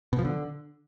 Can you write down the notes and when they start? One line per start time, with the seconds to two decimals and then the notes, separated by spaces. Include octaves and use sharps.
0.13 B2
0.19 F3
0.25 D3